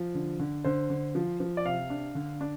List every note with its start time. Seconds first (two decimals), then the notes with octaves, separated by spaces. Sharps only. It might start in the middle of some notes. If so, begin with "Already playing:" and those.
Already playing: F3
0.15 D3
0.40 D3
0.64 D3 C5
0.90 D3
1.15 F3
1.40 F3
1.57 D5
1.65 C3 F5
1.90 D4
2.15 D3
2.41 D4